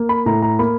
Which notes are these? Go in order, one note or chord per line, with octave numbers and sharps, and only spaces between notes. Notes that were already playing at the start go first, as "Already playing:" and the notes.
Already playing: A#3
B5
A2 A#5
A#5
A#3 B5